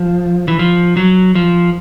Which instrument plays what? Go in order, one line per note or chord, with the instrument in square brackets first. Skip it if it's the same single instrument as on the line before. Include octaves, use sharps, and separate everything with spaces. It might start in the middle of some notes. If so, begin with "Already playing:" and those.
Already playing: [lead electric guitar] F3
E3
F3
F#3
F3